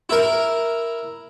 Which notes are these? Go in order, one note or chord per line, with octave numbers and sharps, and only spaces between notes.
E4 A#4